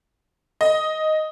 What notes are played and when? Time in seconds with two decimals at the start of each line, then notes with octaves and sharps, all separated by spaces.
0.61 D#5